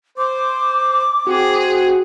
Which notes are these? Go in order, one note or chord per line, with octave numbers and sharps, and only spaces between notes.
C5 D6
C4 F#4 G#4